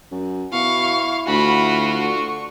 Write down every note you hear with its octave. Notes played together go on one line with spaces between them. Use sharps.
F#2
B2 E4 F5 C#6
D2 F4 F#4 B5
D3 C#6